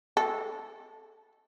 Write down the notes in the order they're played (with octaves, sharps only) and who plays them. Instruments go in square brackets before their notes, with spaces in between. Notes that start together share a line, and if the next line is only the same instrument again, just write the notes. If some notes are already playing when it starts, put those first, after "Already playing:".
[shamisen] A4